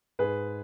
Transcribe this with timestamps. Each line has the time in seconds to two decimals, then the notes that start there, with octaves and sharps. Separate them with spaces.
0.19 G#2 G#4 B4